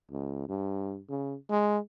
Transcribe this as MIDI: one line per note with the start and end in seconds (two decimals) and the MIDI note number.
0.12 0.45 37
0.49 0.99 43
1.09 1.35 49
1.50 1.78 56